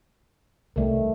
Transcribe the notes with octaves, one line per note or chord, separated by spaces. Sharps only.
C2 D#3 G3 A3